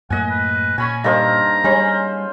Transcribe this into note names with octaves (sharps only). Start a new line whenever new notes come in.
F#2 A2 A#3 D#5 F#5 G#5
B4
A#2 C#4 G#5 B5 C#6
G2 A#3 D#4 A4 C5 F5 A#5
G3 G#3 C#4 C5 B5